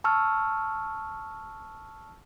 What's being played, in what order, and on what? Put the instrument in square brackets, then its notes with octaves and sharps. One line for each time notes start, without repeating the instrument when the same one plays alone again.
[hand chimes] A5 C#6 E6 F6